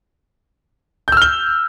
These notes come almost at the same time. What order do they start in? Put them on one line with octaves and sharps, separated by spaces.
G6 E6 F6 G7